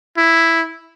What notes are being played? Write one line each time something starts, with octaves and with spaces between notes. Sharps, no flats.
E4